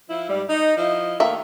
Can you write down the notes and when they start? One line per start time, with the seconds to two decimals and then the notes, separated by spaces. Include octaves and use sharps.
0.10 F3 E4
0.29 G#2 G3
0.49 D#4
0.77 F3 E4 D#5
1.20 D#3 A3 A#3 E5